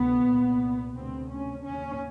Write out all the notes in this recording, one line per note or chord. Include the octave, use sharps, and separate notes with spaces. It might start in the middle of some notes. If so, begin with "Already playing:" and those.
Already playing: D2 C3 B3
C2 A#2
D2 C3 C4
C#4
D#2 C#3 C#4